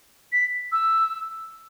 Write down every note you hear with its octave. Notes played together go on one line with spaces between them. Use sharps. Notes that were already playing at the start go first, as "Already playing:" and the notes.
B6
E6